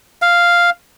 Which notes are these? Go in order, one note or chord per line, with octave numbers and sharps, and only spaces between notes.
F5